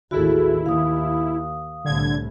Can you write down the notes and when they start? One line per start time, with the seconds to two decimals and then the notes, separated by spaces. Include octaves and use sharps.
0.11 A1 D#2 E4 F#4 G#4 A4
0.66 D#2 F5 D#6
1.84 C2 A2 D3 G#6